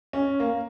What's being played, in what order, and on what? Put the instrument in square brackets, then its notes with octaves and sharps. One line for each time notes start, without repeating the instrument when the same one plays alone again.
[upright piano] C#4
A#3